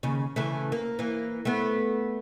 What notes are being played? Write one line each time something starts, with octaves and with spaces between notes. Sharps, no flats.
D#2 C#3
C#3 E3 A3
A#3
E3 A#3
A3 B3